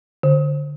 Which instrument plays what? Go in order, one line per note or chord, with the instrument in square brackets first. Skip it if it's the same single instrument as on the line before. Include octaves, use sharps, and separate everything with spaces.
[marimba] D3